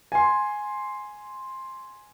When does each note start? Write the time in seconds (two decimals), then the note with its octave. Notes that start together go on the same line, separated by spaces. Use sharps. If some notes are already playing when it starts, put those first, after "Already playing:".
0.12 G#5 C6